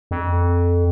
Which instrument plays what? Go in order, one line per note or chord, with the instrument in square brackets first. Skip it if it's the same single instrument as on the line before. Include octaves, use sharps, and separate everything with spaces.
[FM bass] F2